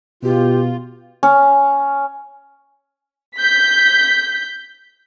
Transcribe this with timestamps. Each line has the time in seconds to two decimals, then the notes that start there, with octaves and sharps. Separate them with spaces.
0.23 B2 F4 G4
1.23 C#4
3.38 G6 B6